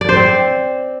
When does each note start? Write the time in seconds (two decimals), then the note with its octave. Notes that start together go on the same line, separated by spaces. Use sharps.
0.01 D5
0.09 C5
0.16 C4